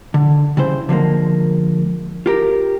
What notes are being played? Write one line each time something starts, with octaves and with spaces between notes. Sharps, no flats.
D3
C#3 G3 E4 C5
D3 F3 G#3 A#3
F4 G4 A#4